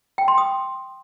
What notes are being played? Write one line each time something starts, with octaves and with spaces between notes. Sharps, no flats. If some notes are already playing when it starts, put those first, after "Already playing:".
G5
C6
D#6